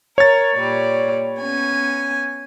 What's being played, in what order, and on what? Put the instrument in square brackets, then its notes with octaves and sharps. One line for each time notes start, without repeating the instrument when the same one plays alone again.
[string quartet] A#4 [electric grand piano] C#5 A6
[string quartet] A#2 G3 D5
B3 C#4 G#5